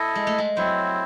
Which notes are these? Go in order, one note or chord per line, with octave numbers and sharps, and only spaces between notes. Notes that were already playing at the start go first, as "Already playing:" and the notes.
Already playing: E4 A4 D#5
G#3
A3
G#3
F#3 C4 E4 C5